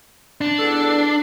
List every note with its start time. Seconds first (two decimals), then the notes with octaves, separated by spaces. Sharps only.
0.41 D4
0.59 E2 B2 A4